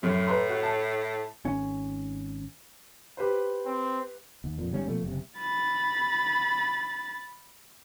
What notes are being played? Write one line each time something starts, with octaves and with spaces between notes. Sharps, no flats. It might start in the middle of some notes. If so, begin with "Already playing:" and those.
F#2 A2
B4 A#5 C6
F#4
A5
G#1 C#4
G4 B4 C5
C4
D#2
F2 A#2
G1 G#2 G3 C#4
B2 F3 A3 A#3
F#1 A2 C3
B5 A6